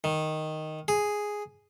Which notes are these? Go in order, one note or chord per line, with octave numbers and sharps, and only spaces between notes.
D#3
G#4